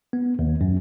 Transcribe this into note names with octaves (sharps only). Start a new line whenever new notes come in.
B3
D#2
F#2